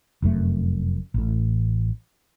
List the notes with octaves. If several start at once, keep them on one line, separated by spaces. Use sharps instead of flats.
F1 F#2 C3 A3
A1 A2